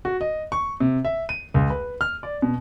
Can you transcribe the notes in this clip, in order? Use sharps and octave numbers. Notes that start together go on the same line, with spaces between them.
F#4
D#5
C#6
C3
E5
D#7
C#2
B4
F6
D5
B2